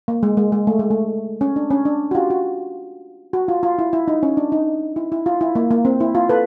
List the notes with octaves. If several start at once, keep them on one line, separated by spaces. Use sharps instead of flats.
A#3
G#3
G#3
G#3
A3
G#3
A3
C#4
D4
C#4
D4
F#4
F4 G4
F#4
F#4
F4
F4
E4
E4
D#4
C#4
D4
D#4
E4
E4
F4
E4
A#3
A#3
C4
E4
F4
A4 B4